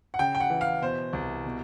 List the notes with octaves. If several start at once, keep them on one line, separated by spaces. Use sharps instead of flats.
F#5
C#3 G5
G5
F#5
E3
F5
B2 C5
C2
B2